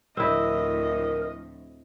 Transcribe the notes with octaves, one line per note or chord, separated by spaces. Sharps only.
D2 A2 F3 C4 E4 A#4 D#5